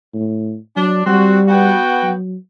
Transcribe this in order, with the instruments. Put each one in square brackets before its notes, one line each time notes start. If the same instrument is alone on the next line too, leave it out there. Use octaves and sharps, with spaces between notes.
[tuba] A2
[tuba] F#3 [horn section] D4
[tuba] G3 [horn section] C4 F#4
[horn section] B3 F#4 G5
[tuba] F#3